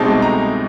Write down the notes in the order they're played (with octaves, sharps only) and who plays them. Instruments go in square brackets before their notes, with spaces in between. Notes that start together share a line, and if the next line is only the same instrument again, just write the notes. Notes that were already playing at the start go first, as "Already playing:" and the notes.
Already playing: [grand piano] C2 B2 G#3 C4 D#4 A5
A#5